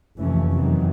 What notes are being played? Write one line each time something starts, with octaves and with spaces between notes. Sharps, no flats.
F1 D#2 E3 A3 C#4
F#2 C3 D#3 E3 F#3